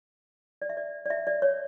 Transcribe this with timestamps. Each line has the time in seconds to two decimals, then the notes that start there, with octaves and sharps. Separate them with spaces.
0.62 D5
0.69 E5
0.77 D5
1.06 D5
1.10 E5
1.27 D5
1.42 C#5